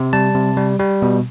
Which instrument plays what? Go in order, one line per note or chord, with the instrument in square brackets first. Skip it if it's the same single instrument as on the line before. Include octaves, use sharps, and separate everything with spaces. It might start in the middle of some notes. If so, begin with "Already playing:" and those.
Already playing: [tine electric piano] C3
G3 A5
C3
G3
G3
B2